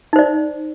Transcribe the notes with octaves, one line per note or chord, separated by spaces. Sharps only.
D#4 C5 D5